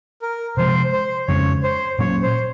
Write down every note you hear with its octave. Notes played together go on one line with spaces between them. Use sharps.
A#4
C3 F3 G#3 C5
C5
F2 C#3 G#3 C#4 C#5
C5
A#2 F#3 A#3 C#4 C#5
C5